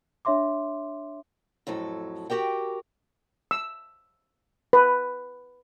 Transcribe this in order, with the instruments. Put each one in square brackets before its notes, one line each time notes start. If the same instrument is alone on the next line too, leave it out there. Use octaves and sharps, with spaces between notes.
[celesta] D4 C#5 E5 C6 D6
[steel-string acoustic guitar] F2 A2 F#3 A4
F#4 G4 A#4 G5
[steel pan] E6
B4